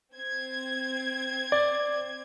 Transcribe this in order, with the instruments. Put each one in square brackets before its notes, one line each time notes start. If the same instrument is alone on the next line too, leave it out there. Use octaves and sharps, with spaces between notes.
[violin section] C4 G#6
[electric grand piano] D5